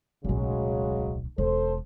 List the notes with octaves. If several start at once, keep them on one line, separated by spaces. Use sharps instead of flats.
D1 B1 C#3 F#3 G#3
E1 A4 C5